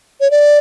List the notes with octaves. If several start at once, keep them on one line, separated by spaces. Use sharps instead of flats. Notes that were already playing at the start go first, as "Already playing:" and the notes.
C#5
D5